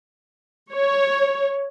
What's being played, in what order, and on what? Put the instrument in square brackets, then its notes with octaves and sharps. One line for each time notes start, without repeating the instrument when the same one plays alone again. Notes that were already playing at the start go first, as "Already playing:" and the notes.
[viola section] C#5